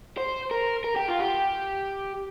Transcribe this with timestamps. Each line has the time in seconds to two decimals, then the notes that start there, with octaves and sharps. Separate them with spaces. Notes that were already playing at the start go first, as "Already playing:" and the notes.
0.17 C5
0.51 A#4
0.84 A#4
0.96 G4
1.08 F4
1.20 G4